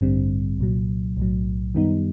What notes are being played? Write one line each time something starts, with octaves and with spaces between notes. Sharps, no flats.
A1 G2 D3 G3 C4
C2 A#2 F#3
B1 A2 F#3
F#2 D#3 G3 B3 D#4